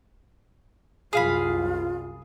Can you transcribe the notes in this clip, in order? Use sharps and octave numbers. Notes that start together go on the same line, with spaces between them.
C2 F#2 F4 G#4 F5 B5